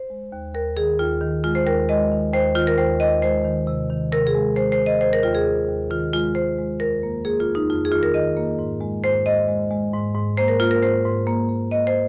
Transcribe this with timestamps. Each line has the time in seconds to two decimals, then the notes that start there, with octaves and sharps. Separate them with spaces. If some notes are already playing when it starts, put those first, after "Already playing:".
Already playing: C5
0.10 G#3
0.32 D#2
0.55 D#2 A#4
0.77 D#3 G#4
0.99 D#2 F4
1.21 D#3
1.44 G#3 F4
1.55 C5
1.66 D#2 A#4
1.89 G#3 D#5
2.12 D#3
2.33 D#2 C5
2.55 D#3 F4
2.67 A#4
2.78 D#2 C5
3.00 D#2 D#5
3.22 G#3 C5
3.45 D#3
3.67 C3
3.90 D#3
4.12 C3 A#4
4.27 G#4
4.34 G#3
4.56 G#3 C5
4.72 C5
4.79 C3
4.86 D#5
5.01 D#2 C5
5.13 A#4
5.23 D#2 F4
5.35 G#4
5.47 D#2
5.68 D#2
5.91 D#3 F4
6.13 G#3 F4
6.35 G#3 C5
6.58 G#3
6.80 F2 A#4
7.03 A#3
7.25 A#3 G#4
7.40 F4
7.47 F2
7.55 D#4
7.69 F2 F4
7.85 G#4
7.92 D#3 F4
8.03 A#4
8.14 D#3 D#5
8.37 A#3
8.59 G#2
8.81 G#3
9.04 G#2 C5
9.25 G#3 D#5
9.48 G#3
9.71 G#3
9.93 G#2
10.15 G#2
10.37 A#3 C5
10.48 A#4
10.60 A#3 F4
10.71 A#4
10.82 G#2 C5
11.05 G#2
11.27 A#3
11.49 A#3
11.71 A#3 D#5
11.87 C5